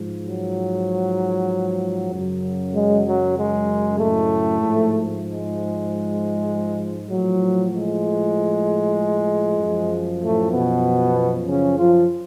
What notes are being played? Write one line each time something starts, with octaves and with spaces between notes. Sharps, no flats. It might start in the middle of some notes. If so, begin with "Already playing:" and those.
Already playing: G#2 F3
F#3
F#2 C#3 F#3
G#3
F#3
G#3
A2 A3
G#2 F3
G#3
A2 F3 F#3
G#3
F#2 F3
A2 A3
B2 B3
C#3 C#4
F3 F4